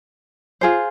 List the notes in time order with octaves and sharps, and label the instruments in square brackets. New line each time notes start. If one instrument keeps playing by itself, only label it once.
[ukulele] F4 G#4 C5